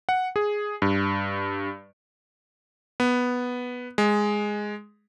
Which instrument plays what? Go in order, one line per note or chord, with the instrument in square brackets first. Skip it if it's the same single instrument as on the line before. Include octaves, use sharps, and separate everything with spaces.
[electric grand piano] F#5
G#4
G2
B3
G#3